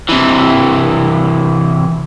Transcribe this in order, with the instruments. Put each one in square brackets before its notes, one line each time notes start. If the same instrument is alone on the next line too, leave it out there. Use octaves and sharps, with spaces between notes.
[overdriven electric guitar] C3 E3